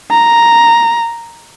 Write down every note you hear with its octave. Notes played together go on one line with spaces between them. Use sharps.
A#5